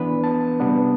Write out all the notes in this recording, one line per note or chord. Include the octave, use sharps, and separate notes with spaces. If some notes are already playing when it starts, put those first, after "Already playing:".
Already playing: E3 B3 D4 B4
A5
C3 G3 B3 D4